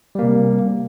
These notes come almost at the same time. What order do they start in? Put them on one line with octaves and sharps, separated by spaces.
G3 A#3 C3